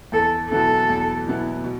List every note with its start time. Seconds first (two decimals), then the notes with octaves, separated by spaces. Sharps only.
0.12 E2 A4
0.50 B2 F#3 B3 E4 A4
0.89 E2
1.27 B2 F#3 B3 E4
1.64 B2